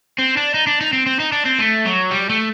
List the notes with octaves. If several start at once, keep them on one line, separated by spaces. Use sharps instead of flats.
C4
D4
D#4
D4
D#4
C4
C4
D#4
D4
C4
A3
F#3
G3
A3